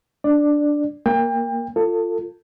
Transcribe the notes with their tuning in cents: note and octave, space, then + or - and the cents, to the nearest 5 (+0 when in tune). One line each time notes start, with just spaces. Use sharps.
D4 +0 D5 +10
A#3 +0 G5 +35
F4 +0 A4 +25